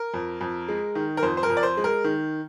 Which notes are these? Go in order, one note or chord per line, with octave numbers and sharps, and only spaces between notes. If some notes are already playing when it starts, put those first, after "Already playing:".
Already playing: A#4
F2
F2
G#3
D#3
A#4
F2 C5
C5
A#4
F2
D5
C5
G#3
A#4
D#3